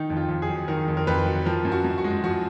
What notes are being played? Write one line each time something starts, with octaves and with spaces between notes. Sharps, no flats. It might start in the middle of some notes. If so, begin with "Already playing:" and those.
Already playing: D#3 D#4
F2
F4
F2
G#4
F#3
D#3 A#4
F2
A#4
F2 B4
F#3
F3 A#4
F#2
F#4
F#2
F#4
G#3
F3 F#4